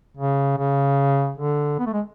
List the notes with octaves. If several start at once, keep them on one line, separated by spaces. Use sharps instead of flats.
C#3
C#3
D3
B3
A3
G#3